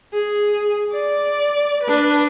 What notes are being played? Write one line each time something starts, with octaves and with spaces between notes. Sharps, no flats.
G#4
D5
D4 B4